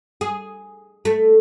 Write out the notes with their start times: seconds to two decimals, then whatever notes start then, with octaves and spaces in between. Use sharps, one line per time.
0.21 G#4
1.05 A3